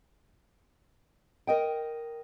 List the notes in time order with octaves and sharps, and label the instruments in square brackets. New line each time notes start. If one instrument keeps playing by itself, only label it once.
[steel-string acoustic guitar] A#4 D#5 G5